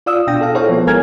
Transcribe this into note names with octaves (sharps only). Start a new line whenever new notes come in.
F4 D5 F5 D#6 E6
B2 D4 G5 A#6
A4 F5
E4 A4 C5 C#5 F5
F3 B3
G#1 G#3 A#4 G#5 F6 G#6